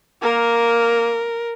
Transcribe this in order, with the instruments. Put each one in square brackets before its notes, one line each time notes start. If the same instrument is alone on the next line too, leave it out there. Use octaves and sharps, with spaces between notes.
[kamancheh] A#3 [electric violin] A#4